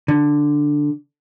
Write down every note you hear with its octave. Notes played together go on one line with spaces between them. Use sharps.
D3